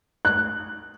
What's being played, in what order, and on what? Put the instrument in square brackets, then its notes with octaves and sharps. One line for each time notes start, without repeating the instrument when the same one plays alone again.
[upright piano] F#6